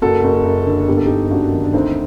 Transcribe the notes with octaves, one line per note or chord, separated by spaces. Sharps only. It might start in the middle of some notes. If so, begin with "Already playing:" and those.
F#1 F#4 A4
F#1
F#2
D3
G1 G4
A4
G1 D#4 G4
F#2 D4 F#4
D#3
D4
D2 C4 D#4